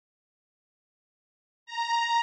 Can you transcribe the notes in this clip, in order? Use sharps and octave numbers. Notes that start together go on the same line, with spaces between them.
A#5